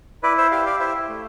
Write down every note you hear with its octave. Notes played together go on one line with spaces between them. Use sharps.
E4 B4 D5
C5 E5
G4 D5 F5
D5 F5
E4 C5 E5
A3